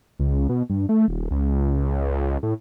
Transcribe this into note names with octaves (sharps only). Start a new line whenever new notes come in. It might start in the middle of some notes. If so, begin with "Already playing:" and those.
C#2
B2
G2
A3
D#1
C#2
A2